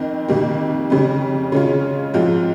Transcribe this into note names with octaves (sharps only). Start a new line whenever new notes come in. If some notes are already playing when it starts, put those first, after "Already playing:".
Already playing: F2 D#3 C4
F2 C3 D#3 G3 A#3
F2 C#3 G3
C#3 G#3 C#4 F4
G#2 F3 C4 F4